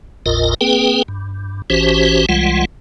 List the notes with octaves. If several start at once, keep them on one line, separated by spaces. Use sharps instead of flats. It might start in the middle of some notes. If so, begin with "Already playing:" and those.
G#1 D#2 A2 F4 A#4 D#5
A#3 C4 G#4 B4 G5
G2
A1 E3 C#4 F#4 G4 C5
C2 E3 G3 G#3 F4 F#5